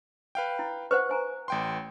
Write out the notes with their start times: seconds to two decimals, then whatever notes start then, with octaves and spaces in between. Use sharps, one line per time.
0.35 B4 F5 G5
0.59 E4
0.91 B4 C5 F#5 C#6
1.09 C5 G#5 A#5
1.48 A1 G5 C6